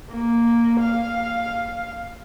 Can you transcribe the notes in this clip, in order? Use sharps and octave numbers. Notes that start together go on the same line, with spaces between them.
A#3
F5